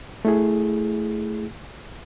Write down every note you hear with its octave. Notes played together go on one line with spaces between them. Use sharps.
A3 E4 G#4